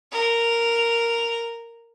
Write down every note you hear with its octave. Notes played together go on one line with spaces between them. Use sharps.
A#4 F7